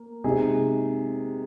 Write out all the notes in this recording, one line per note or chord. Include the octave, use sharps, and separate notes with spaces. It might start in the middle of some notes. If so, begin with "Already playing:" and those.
Already playing: A#3
C3 G#3 D#4 G#4